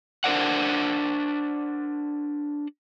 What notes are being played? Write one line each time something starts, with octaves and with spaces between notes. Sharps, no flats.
D4 A#4 C5 D5 F#5